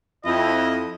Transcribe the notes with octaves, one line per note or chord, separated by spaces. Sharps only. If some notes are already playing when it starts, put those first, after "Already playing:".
F2 E4 D#5